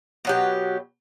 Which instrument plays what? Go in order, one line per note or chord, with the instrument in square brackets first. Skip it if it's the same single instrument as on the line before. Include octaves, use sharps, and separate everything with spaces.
[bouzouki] B2 F#3 G4